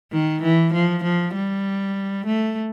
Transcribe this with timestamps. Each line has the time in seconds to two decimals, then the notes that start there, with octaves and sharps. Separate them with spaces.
0.12 D#3
0.42 E3
0.74 F3
1.04 F3
1.34 G3
2.26 A3